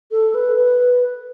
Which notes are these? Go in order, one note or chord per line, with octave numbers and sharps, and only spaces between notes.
A4
B4
B4